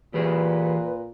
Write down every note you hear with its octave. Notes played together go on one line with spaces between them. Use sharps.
A#2 E3 G4 G#4 B4